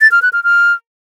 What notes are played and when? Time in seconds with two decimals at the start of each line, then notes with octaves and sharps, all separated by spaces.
0.01 A6
0.11 F6
0.22 F#6
0.33 F6
0.44 F6